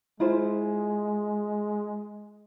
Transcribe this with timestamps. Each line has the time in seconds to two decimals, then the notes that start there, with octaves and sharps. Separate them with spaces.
0.20 G#3 E4 F4 C5